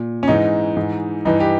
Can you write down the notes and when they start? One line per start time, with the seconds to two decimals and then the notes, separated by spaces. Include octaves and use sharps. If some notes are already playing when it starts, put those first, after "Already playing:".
Already playing: A#2
0.23 C#4
0.28 G#2 E3 D#4
0.76 G#2 E3
1.25 G2 E3 D#4
1.40 G4